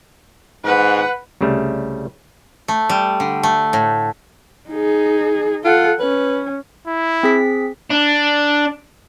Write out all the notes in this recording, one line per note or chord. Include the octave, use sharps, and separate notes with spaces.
G#2 B4 F#5
C2 C#3 G3 A3
A3
G3
D3
A3
A2
D#4 G#4
F4 A4 F#5
C#4 B4
E4
C4 G#4 B6
D4